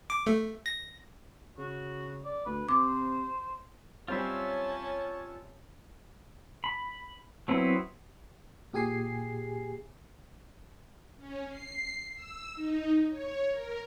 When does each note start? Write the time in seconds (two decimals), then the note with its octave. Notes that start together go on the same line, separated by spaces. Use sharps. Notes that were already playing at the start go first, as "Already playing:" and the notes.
0.10 D6
0.26 A3
0.66 A#6
1.58 C#3 F#4
2.25 D5
2.46 D2 B4
2.69 C3 C5 D6
4.08 G3 C4 C#4 F4 C#5 E5 A5
6.64 B5
7.48 F#3 B3 C4 E4 B4
8.73 A#2 G4 G#4 G#5 C7
11.17 C#4
11.49 C7
12.13 E6
12.54 D#4
13.09 C#5
13.51 A#4